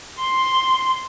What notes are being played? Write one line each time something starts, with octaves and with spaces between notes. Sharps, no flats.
C6